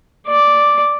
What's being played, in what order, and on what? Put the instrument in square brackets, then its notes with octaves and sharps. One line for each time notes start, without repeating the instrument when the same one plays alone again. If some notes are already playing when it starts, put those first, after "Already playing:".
[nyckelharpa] D5